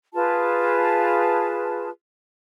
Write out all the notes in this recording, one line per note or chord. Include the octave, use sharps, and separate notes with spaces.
F4 G#4 B4 A5